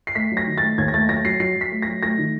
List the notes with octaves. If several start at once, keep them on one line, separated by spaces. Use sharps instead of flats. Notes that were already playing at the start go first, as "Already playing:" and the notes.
C7
A3 B6
F#3
A#6
D#3
A6
A3
D#2 G#6
A#6
A3 A6
F#3 A#6
F#3 C7
F#3 C7
F#3
B6
A3
F#3 A#6
A3 A#6
D#3